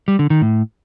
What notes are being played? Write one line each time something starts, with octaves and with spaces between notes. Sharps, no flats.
G3
D3
D#3
A2